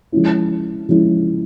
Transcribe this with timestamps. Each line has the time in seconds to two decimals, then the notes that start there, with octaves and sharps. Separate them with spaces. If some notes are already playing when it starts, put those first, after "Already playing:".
0.12 F3 G#3 C#4 E4
0.89 F3 G#3 C#4 E4